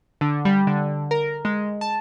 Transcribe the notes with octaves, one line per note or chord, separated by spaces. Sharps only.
D3
G3
D3
A#4
G#3
A5